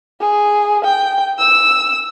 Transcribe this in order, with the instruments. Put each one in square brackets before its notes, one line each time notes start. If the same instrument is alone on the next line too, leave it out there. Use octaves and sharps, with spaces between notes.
[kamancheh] G#4
G5
E6